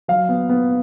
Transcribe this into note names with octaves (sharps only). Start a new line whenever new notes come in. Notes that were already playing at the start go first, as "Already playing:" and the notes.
F#3 F5
B3
B3